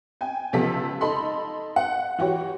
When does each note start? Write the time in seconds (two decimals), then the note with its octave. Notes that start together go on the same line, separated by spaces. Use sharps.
0.21 G5 G#5
0.53 C#2 C3 F3 B3 A4 B6
1.01 D#4 A4 B5 C6
1.76 F#5
2.18 E3 F#4 G4 C#5